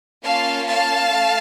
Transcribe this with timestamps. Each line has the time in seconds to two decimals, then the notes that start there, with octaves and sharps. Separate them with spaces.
0.23 A#3 C#4 F4 F5 A5
0.66 F5 A5
1.10 A3